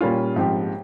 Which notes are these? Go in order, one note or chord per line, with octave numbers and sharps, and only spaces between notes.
A#2 G3 A#3 C#4 F4
G#2 F3 C4 G4